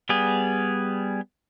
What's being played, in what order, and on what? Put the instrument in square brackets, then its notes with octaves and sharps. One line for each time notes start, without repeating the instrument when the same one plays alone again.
[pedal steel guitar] G3 B3 G#4